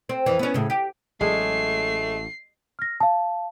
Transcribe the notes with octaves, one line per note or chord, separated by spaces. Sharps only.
C4
F2 E3
B3 C#4
A2 C#3
G4
A1 F#3 G#3 A3 C7
F6 A#6
F5 A5